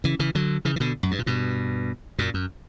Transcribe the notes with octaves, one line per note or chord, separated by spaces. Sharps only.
C#3 E3
C#3 E3
D3 F#3
C#3 E3
E3
B2 D3
F#2
G2
A#2
G2 B2
F#2 A#2
F#2